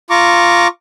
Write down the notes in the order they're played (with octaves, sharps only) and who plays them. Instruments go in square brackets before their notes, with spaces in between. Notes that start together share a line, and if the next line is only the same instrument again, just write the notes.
[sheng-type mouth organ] F4 A#5 C#6 D6